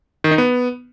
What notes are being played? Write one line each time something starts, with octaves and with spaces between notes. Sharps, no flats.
D#3
D#4
B3